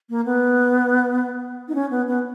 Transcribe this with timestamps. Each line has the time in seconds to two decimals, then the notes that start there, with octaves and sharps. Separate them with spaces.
0.10 A#3
0.25 B3
1.68 D#4
1.75 C#4
1.91 B3
2.08 B3